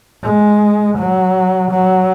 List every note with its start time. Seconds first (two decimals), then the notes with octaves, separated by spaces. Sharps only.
0.23 G#3
0.98 F#3
1.71 F#3